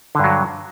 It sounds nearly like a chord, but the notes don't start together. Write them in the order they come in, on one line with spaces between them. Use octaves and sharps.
D3 G2 F#3